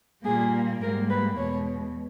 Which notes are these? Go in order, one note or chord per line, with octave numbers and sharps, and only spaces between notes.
A#2 G3 A#3 G#4
G#2 G3 A#3 A#4
B4
E2 B2 G#3 C#5